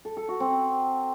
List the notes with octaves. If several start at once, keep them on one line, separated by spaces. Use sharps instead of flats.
A4
A4
F#4
C4